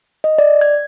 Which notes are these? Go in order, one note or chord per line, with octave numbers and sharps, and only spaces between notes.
D#5
D5
G#6